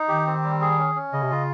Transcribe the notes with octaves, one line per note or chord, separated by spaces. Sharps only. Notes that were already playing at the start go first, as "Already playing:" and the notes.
Already playing: D#4
D#3 G4
C4
G3
G#4
C#4
C#4
C#3 D#5
C3
C#3 F4